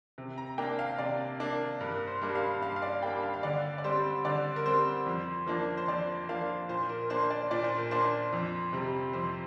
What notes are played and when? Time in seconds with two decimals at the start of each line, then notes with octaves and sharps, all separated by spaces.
0.18 C3
0.38 A#5
0.58 A#3 D4 G5
0.79 F5
0.98 C3 D5
1.40 A#3 D4
1.81 G2 A#4
2.07 C5
2.22 G3 A#3 D4
2.35 F5
2.61 G2 F5
2.76 F5
2.82 D5
3.02 G3 A#3 D4 G5
3.23 F5
3.34 F5
3.43 D3 D5
3.78 D5
3.84 G3 C4 C5
4.25 D3 D5
4.56 A#4
4.66 G3 C4 C5
5.06 F2
5.47 F3 A#3 D4
5.77 C5
5.88 F2 D5
6.29 F3 A#3 D4 F5
6.69 A#2 C5
6.89 A#4
7.10 A#3 D4 C5
7.30 D5
7.51 A#2 D5
7.64 C5
7.78 A#4
7.91 A#3 D4 C5
8.33 F2
8.73 C3 G3
9.13 F2 C5